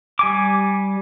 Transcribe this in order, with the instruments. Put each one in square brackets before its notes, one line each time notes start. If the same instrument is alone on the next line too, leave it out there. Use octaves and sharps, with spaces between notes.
[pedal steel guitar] G3 G#5 D6